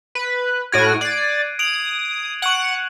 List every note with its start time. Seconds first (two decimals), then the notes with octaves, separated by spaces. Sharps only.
0.15 B4
0.72 A2 F#4 F6 G#6 D7 D#7
1.01 D5 F#6 C7
1.59 D#6 D7 F7 F#7
2.42 F#5 C#6 F#6 F#7